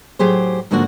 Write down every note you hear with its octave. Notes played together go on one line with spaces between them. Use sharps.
A2 F#3 G4 G#4 C5
G#2 D3 F3 A#3 D4 F#4